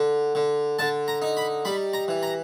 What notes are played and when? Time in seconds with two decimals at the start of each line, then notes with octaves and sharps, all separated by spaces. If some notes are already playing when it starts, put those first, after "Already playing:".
Already playing: D3
0.35 D3
0.79 D3 A5
1.08 A#5
1.22 D#4
1.37 B5
1.65 G3 B5
1.93 A#5
2.08 E3
2.23 A#5